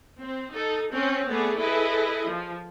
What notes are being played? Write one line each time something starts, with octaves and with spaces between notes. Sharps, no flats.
C4
D#4 A4
C4 C#4
A3 B3 G#4 D5
E4 G#4 A4 B4 D#5
F3